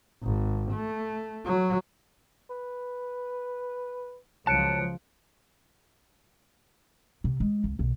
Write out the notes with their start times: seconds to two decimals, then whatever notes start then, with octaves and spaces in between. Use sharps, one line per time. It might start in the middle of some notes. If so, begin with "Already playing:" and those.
0.23 G#1
0.71 A3
1.46 F#3
2.50 B4
4.47 C#2 F3 F#3 A5 F#6 C#7 D7
7.24 C3
7.40 G#3
7.64 C#2
7.79 B1